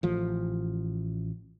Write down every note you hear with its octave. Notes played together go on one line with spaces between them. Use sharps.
A1 F3